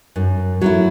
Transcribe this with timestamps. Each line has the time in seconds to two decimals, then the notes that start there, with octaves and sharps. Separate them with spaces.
0.16 F#2
0.61 F#3 A3 E4